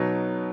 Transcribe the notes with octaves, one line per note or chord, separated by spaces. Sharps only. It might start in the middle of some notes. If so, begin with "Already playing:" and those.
Already playing: B2 F#3 B3 D#4